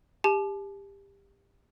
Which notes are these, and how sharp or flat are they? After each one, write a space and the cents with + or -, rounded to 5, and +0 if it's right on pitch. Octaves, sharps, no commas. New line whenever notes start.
G4 +20 A5 -40